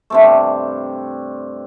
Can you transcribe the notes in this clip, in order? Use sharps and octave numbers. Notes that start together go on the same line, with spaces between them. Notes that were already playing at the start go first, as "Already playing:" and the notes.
G2 C3 A3